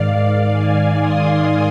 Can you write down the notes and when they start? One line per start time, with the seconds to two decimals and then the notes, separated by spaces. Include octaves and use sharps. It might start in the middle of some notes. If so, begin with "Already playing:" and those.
Already playing: G#2 D#3 D5 F5
0.49 F5 G#5
0.98 C6 D#6